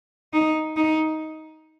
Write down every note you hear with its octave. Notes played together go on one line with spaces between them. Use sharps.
D#4
D#4